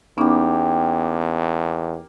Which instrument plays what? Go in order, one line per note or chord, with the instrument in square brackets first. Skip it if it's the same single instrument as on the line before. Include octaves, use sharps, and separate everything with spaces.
[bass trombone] E2 [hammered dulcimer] A#3 G4 [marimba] B3 C#4 D#4